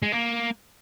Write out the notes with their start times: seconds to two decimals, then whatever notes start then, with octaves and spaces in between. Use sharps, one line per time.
0.03 G#3
0.12 A#3